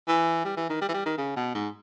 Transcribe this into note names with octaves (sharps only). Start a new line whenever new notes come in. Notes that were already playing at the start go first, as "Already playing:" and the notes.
E3
G3
E3
D#3
G3
E3
G3
D#3
C#3
B2
G#2